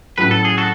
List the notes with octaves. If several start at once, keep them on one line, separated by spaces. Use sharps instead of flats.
A2 F#3 C#4 E4 B4
A4
G#4
F#4 A4